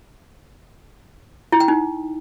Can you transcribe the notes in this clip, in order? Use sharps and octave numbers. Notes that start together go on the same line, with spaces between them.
E4
G5
D#4